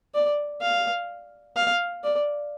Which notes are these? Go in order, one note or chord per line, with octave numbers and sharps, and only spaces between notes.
D5
F5
F5
D5